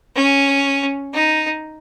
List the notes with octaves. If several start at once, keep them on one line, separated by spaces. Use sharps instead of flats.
C#4
D#4